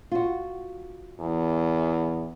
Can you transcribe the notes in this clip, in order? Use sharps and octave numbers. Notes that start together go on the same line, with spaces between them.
F4 F#4
E2